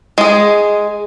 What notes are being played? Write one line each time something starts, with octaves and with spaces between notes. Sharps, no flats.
G#3 G#4